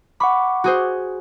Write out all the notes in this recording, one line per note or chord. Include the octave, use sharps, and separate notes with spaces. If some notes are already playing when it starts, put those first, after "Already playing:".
F#5 B5 C#6 D6
F#4 G#4 C5